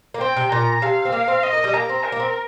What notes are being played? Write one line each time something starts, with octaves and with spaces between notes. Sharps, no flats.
A#3
C4 G5
C3
A#2 A#5
C3 F5
C4
A#3
C4
C4 D#5
A#3
G3
A#3 A#5
C4
A#4
A#3
C4